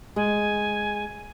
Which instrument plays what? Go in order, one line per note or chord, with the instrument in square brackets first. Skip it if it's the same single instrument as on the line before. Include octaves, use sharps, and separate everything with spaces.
[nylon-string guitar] G#3 [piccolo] G#5